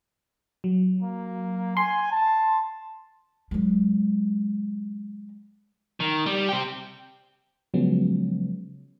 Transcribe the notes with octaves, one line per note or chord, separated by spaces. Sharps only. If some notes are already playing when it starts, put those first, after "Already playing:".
F#3
A#3
G#5 C6
A5
F#3 G#3
D#3
G3
C4 G4
C#3 F3 F#3 G#3 B3 C#4